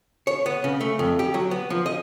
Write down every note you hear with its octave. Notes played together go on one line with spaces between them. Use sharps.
C#5
B3
C#3
A3
F2
G4
F#3
B3
F3
D#5